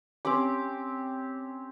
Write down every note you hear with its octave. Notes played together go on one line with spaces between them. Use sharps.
C4 C#4 G4 D6